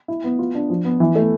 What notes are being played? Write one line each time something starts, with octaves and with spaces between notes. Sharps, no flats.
E4
B3
F4
D4
F3
B3
E3
A3